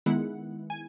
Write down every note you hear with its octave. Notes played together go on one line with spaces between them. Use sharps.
D#3 G#3 B3 E4 F#5
G#5